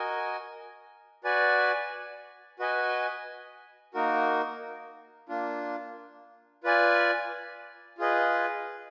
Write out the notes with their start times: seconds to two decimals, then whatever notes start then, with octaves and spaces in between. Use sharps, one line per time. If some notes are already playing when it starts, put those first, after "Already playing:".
Already playing: F#4 A#4 D#5 G#5
1.24 F#4 B4 D5 G#5
2.59 F#4 B4 D#5 G#5
3.94 A#3 D#4 F#4 A#4
5.29 A#3 D4 F4
6.64 F4 B4 D5 G#5
7.98 F4 G#4 B4 D#5